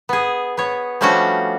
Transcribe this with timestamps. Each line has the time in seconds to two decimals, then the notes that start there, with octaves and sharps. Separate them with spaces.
0.09 B3 G#4
0.57 B3 C#5
1.01 F3 G3 A3 C#4 D4 F#4